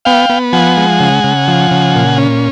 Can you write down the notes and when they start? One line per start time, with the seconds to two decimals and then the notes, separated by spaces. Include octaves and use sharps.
0.05 B3 F5 G5
0.30 B3
0.53 F3 F#5 G#5
0.77 G#3
1.00 C#3
1.24 C#3
1.48 F3
1.71 C#3
1.95 A#2
2.18 C#4